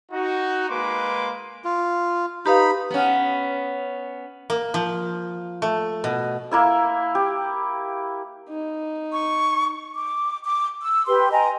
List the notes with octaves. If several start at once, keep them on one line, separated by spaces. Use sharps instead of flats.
D#4 F#4
G#3 A#3 B4 C6 D6
F4
D#4 G4 B4 F5 B5
B3 C#4
A#3
F3
A3
B2
A#3 E4 E5
G4
D#4
C#6
D6
D6
E6
G4 B4 C6
D#5 G5 G#5 A#5